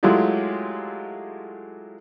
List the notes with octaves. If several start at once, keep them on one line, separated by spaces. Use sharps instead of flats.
F#3 G#3 A3 E4 F4 G4